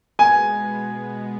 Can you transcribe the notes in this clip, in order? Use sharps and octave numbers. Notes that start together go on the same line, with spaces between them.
B2 G#3 B3 G#5